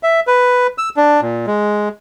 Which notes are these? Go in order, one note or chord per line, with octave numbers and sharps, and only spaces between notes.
E5
B4
E6
D4
A#2
G#3